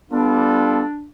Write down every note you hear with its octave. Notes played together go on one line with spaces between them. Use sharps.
G3 B3 D4 F4 A4